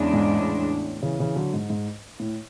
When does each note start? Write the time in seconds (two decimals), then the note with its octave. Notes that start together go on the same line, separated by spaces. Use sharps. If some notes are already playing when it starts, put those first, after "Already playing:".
Already playing: E2 C#3 G#3 D4
0.13 G#2
0.36 A2
1.02 C#3 E3
1.19 C#3 E3
1.36 D3 F#3
1.54 G#2
1.70 G#2
2.20 A2